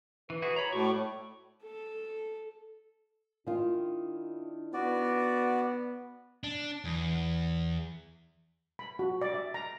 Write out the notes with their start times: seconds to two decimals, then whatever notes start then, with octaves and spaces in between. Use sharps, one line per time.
0.30 E3 B4
0.42 E4 F#4 G#4
0.56 C#5 A#5 B5
0.72 A2 F#4 D5 C#6
1.63 A4
3.47 D#3 D4 E4 F4
4.74 B3 F#4 D5
6.44 D4
6.85 E2
8.79 B5
8.99 F#4
9.21 D5
9.34 E5
9.54 A#5